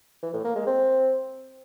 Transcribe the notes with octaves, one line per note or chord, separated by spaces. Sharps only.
E3
A2
A#3
G#3
C4